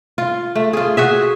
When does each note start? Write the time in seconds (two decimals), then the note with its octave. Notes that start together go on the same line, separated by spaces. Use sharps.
0.18 F4
0.56 A3
0.73 F4 G#4
0.97 F#4 G#4 E5